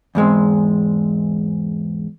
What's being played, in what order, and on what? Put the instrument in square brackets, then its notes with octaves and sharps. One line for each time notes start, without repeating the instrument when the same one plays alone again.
[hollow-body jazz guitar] E2 G#2 G#3 C4